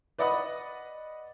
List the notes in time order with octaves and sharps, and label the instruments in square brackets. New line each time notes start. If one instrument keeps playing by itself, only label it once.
[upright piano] B4 D5 D#5 F#5 B5 D#6